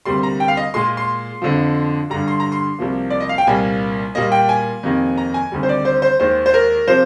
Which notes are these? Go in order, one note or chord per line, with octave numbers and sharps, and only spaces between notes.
D2 C3 G3 A#3 C6
A#5
G5
F5
D#5
A#2 G#3 C6
C6
F2 D3 F3
G2 D3 G3 A#5
C6
A#5
C6
C2 C3 F3 A#3
D5
D#5
F5
G5
C2 A#2 G3 A#3 G#5
A#2 G3 A#3 D#5
G5
G#5
F2 C3 D#3 A#3
A#5
G#5
D2 C3 D#3 G3
C5
D5
C5
C5
D#2 D#3 G#3 C5
C5
A#4
C3 F3 C5